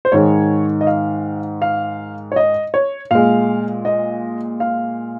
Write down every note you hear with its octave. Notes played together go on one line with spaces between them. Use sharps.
C5
G#2 D#3 G#3 C#5
D#5
F5
F5
C#5
D#5
C#5
A#2 G#3 F5
D#5
F5